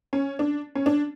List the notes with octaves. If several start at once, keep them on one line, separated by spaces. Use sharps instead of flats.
C#4
D4
C#4
D4